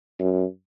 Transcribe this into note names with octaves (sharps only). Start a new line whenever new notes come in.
F#2